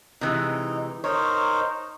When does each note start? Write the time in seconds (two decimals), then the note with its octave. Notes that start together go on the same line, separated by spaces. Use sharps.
0.21 C3 E3 G#3 D#4
1.04 D#4 A#4 C5 C#5